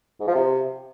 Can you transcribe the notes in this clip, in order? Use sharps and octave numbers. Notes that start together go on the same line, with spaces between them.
G#2
F3
C3